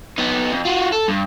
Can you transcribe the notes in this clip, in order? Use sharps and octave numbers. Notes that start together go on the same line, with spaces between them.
B3 D#4
F2
F4 F#4
A4
G2